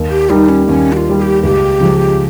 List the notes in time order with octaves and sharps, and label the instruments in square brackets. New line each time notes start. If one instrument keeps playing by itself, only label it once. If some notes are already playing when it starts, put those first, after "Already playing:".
Already playing: [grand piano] D#2
[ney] G4
[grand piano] D#3 G3 [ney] D#4
[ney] C#4
[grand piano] D#2 [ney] C#4
[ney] G4
F4
[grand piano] D#3 G3
[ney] G#4
G4
[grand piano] C#2 [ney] G4
[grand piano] C#3 F3 G#3